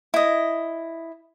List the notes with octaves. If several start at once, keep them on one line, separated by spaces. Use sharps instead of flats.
E4 D#5